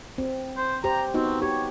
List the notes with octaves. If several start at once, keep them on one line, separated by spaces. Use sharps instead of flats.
C4
C5
G4 C5 A#5
B3 C4 D#4 F#4
G4 C#5